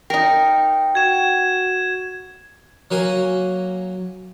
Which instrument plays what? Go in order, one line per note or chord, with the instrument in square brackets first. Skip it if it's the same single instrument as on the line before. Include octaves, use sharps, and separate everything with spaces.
[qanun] D#4 A#4 [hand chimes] G5
[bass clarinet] F#4 [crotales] G#6 E7
[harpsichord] F#3 A#3 G#5